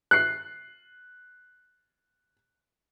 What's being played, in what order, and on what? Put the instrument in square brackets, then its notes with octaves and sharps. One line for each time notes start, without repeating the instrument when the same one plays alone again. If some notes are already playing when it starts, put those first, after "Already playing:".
[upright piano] F#6 C7